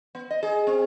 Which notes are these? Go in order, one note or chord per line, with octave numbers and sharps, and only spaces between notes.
B3
D#5
G#4
C4